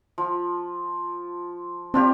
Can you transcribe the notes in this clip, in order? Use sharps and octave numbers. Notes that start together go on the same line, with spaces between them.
F3
C4 D4 F4 G4